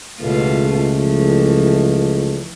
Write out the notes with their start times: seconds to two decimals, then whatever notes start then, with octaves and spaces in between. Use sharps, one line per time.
0.20 C#2 B2 E3 A3 F4
0.97 E3 F3